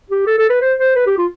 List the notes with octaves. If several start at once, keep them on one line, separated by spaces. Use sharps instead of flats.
G4
A4
A4
B4
C5
C5
B4
G4
F4